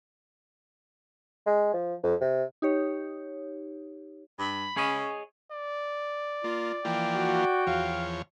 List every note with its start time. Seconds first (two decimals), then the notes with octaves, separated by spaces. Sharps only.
1.47 G#3
1.74 F3
2.03 F2
2.21 C3
2.62 D#4 G4 C#5
4.39 G2 B5
4.77 C#4 G#4 C#5 D#5
5.51 D5
6.44 A#3 F4
6.85 E3 F3 A#3 G5
7.15 F#4
7.67 E2 F3 C#5 F5